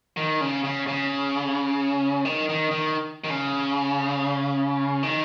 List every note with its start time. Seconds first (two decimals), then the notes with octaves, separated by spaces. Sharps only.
0.17 D#3
0.41 C#3
0.64 C#3
0.87 C#3
2.25 D#3
2.49 D#3
2.71 D#3
3.24 D#3
3.30 C#3
5.03 D#3